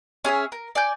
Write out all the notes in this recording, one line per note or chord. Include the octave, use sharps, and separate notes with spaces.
C#4 G#4 C#5 E5
A#4
D5 G#5 G6